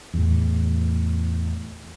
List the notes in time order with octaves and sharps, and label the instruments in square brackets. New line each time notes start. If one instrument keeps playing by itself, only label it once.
[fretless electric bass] E2 A2